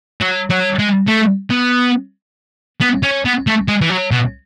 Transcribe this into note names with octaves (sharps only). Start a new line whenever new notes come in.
F#3
F#3
G#3
A3
B3
B3
C#4
B3
A3
G#3
E3
F#3
B2